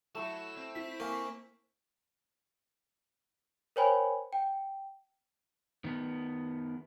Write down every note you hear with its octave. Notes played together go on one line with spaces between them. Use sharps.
F#3 A3 E4 A4 E7
C4
E4 B6
A#3 G#5 C#6
A#4 C5 C#5 G5 G#5 B5
G5
D#3 B3